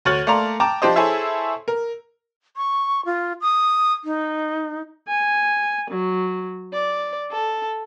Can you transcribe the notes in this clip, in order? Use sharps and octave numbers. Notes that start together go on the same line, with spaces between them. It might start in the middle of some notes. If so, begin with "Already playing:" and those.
D2 F#4 C#5 F6 A6 F#7
A3 A#3 D5 A#5 C6 F7
G5 A5 A#5 D6
F3 D4 G4 C5 D#5
E4 G#4 A4 C5 C#5 E5
A#4
C#6
F4
D#6
D#4
G#5
F#3
D5
A4